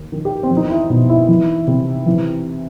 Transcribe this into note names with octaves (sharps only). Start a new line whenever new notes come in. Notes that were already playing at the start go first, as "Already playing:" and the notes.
Already playing: D#2
D#3
G4
C4
E2
D#4
E4
B2 D#4
E4
E3
C3
E3